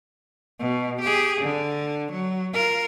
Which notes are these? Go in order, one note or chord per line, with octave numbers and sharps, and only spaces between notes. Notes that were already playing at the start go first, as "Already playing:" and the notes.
B2
G4 G#4
D3
F#3
F4 A#4